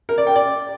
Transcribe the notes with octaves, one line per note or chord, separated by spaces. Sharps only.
A#4
D5
G5
D5